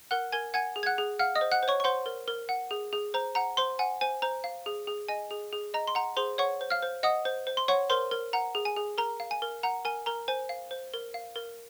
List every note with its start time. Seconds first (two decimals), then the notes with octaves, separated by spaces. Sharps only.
0.11 A#4 F#5 F#6
0.32 A#4 G#5 G#6
0.54 F#5 G#5 G#6
0.76 G#4
0.83 G#6
0.86 F#5 F#6
0.98 G#4
1.19 F5 F#5 F6
1.35 D#5 D#6
1.41 C5
1.51 F#5 F#6
1.63 C5
1.68 C#5 C#6
1.80 C#6
1.84 C5 F#5 C6
2.06 A#4
2.28 A#4
2.49 F#5
2.71 G#4
2.93 G#4
3.14 C5 A#5
3.35 F#5 A#5
3.57 C5 C6
3.79 F#5 G#5
4.01 C5 G#5
4.22 C5 A#5
4.44 F5
4.66 G#4
4.87 G#4
5.08 D#5 G#5
5.31 G#4
5.53 G#4
5.74 D#5 A#5
5.87 C6
5.95 F#5 A#5
6.17 G#4 C5 C6
6.38 C#5 F#5 C#6
6.61 C5
6.70 F5 F6
6.82 C5
7.03 D#5 F#5 D#6
7.25 C5
7.47 C5
7.57 C6
7.68 C#5 F#5 C#6
7.90 A#4 C5 C6
8.11 A#4
8.33 F#5 A#5
8.55 G#4
8.65 G#5
8.76 G#4
8.98 A#4 A#5
9.20 F5
9.31 G#5
9.42 A#4
9.63 F#5 A#5
9.85 A#4 G#5
10.06 A#4 A#5
10.28 C5 G#5
10.49 F5
10.71 C5
10.94 A#4
11.14 F5
11.36 A#4